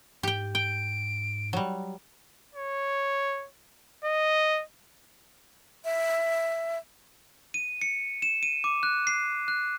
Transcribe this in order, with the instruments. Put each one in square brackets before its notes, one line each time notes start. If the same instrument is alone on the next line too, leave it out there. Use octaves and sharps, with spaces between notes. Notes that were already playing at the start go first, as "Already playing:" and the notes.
[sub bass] G#2 [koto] G4 G5
[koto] G5 [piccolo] D7
[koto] F#3 G3
[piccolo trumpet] C#5
D#5
[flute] E5
[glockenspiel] D#7
C#7
E7
D#7
D6
F#6
C7
F#6